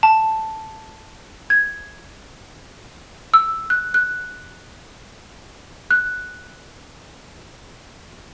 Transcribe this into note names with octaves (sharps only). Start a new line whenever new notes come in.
A5
G#6
E6
F#6
F#6
F#6